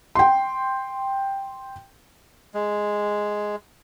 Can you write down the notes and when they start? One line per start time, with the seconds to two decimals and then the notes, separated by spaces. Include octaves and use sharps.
0.15 G5 C6
2.54 G#3